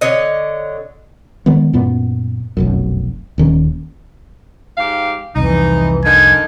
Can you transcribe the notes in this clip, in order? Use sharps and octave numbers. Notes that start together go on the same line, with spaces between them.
D3 C#5 D#5
D#3 G#3 B3
F#2 A#2 B3
F1 B1 F#2
D#1 D#3 C#4
G#2 G4 F5
C2 F2 E3 D#4
D3 A#3 D#4 G#5